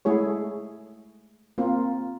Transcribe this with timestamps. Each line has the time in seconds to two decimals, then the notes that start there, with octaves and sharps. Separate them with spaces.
0.05 G#3 A3 E4 G#4 C#5
1.58 A#3 C4 F4